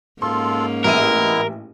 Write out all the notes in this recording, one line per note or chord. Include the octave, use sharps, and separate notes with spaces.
G#2 A#3 C#4 F4 A4 C6
A1 G#3 B3 E4 A#4 E5 D#7